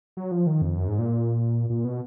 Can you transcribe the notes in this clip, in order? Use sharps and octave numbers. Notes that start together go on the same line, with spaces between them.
F#3
F3
D#3
F2
F#2
G#2
A#2
A#2
B2